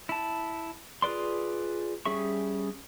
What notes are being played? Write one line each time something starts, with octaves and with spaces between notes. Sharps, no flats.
E4 A5
F4 G#4 B4 D5 C6
G3 C#4 G#4 E5 C#6